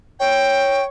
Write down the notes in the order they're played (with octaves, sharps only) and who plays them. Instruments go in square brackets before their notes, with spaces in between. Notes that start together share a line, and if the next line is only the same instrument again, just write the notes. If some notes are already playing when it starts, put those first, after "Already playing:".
[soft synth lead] C#5 [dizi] G5